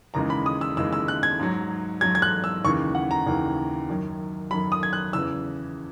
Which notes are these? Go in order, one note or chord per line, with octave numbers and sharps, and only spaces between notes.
D#2 C#3 E3 G#3 A#5
B5
D#6
E6
D#2 C#3 E3 G#3 E6
E6
F#6
G#6
G#2 F#3
G#2 F#3 G#6
G#6
F#6
E6
D#2 C#3 E3 C#6
F#5
A#5
D#2 C#3 E3
F#2 D#3 F#3
F#2 D#3 F#3 B5
D#6
G#6
F#6
E2 C#3 E3 E6